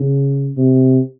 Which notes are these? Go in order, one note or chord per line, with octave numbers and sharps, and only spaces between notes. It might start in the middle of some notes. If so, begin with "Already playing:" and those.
Already playing: C#3
C3